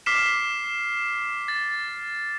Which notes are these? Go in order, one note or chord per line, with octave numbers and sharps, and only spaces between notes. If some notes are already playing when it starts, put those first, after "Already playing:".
D6 F6 B6 C7 E7
A6